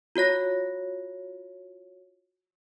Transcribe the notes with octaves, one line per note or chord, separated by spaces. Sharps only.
F4 F#4 C#5 A#6